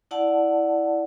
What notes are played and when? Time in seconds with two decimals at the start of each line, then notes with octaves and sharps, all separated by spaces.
0.11 E4 D5 F#5 A5